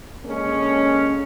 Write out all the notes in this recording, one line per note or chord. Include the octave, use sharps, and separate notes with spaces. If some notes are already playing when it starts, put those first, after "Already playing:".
D3 G#3 A#3 C#4